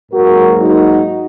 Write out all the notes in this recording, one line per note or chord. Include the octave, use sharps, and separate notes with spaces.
G#2 F#3 A#3 F#4 A#4
D#4 F#4